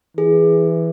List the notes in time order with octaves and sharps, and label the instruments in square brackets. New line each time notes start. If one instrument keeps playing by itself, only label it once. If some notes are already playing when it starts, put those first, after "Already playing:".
[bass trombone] E3 [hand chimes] G#4